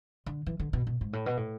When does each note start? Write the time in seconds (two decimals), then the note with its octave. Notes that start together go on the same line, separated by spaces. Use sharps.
0.26 D3
0.46 E3
0.60 D3
0.73 B2
0.87 B2
1.01 G#2
1.13 A2
1.26 B2
1.37 A2